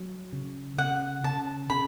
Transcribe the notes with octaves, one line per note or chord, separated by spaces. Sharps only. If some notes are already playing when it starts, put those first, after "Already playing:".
Already playing: F#3
C#3
C#3 F#5
C#3 A5
C#3 B5